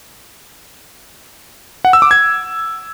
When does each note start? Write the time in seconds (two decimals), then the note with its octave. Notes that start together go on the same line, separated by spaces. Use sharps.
1.85 F#5
1.93 E6
2.02 D6
2.11 G#6